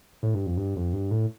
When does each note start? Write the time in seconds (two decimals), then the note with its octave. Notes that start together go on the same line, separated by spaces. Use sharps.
0.23 A2
0.34 G2
0.46 F2
0.57 G2
0.76 F2
0.93 G2
1.11 A2